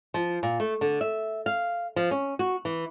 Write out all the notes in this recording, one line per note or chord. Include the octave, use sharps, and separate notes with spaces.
F3
A#2
A3
D3
E5
F5
F3
C#4
F#4
E3